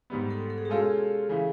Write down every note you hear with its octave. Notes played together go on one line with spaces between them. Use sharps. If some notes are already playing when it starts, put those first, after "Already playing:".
G#2 D#3 G3 B3
A4
A4
G#4
G4
B2 G#3 C#4 F4 G#4 A4
C#3 E3